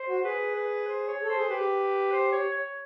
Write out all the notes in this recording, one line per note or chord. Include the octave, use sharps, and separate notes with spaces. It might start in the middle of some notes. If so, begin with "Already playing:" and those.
Already playing: C5
F#4
G#4 B4
B4
C5
C#5
A4 C5
G#4
G4 B4
C5
C#5
C#5